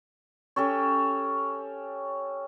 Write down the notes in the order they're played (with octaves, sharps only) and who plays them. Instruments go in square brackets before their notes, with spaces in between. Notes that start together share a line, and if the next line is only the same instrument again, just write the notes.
[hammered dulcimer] C#4 G4 A4 C#5